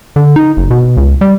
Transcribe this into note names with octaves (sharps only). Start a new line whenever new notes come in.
D3
D#4
F#1
B2
C#2
G3